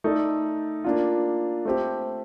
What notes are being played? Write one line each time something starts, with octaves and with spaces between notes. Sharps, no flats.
A3 D#4 A4 D5
A#3 D4 F4
A3 C4 G4